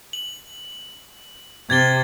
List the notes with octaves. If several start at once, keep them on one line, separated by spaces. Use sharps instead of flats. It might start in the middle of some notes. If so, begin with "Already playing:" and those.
F#7
C3 G#6 A6 G7